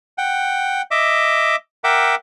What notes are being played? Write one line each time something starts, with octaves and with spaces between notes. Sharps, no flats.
F#5 G5
D#5 E5 D6
A#4 E5 F#5 G5 D6